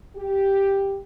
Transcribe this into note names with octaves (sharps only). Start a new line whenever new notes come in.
G4